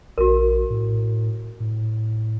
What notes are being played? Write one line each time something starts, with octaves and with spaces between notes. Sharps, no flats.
A#1 F#4 A#4
A2
A2